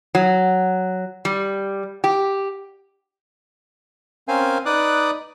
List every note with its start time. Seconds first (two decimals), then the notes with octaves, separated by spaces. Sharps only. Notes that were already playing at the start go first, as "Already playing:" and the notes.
0.15 F#3
1.25 G3
2.04 G4
4.28 C4 C#4 A#4 C5 F5 G#5
4.66 D#4 B4 D5 D6 D#6 F#6